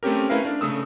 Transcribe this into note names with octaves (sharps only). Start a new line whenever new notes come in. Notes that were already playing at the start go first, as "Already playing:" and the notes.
A3 C4 C#4 G4 A#4
A3 C#4 E4 A#4 B4 F5
D4
C#3 A3 D#6 E6